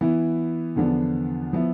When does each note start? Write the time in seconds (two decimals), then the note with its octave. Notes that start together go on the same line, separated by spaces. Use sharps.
0.01 E3 B3 E4
0.76 E2 D3 F3 B3 D4
1.53 F3 B3 E4